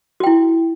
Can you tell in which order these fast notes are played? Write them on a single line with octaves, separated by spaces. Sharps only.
F#4 G5 E4